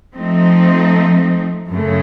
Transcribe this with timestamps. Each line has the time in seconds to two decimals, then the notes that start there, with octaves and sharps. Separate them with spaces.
0.15 F3 A3 C4 D#4
1.71 F#2 C#3 A3